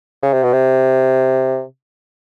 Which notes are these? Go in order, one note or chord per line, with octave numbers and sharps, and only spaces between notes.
C#3
C3
B2
C3